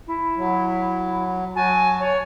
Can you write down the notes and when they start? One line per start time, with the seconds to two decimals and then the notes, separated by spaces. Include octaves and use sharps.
0.07 E4
0.37 F#3
1.56 F#3 F#4 G#5 A5
2.00 C#5